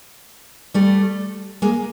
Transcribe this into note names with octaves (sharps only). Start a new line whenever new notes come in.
G3 A3
G#3 A#3